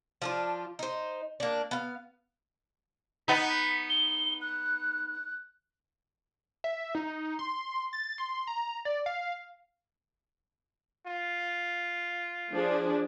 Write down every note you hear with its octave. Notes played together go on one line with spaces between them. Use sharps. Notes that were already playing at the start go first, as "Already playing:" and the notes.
F3 D4 F4
D#4 C5
A#3 D4
B3 F5
B3 D#4 B6
B6
G7
F#6
E5
D#4
C6
A6
C6
A#5
D5
F5
F4
F3 D4 G#4